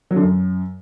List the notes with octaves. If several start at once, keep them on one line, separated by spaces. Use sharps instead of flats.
F#3
D3
F#2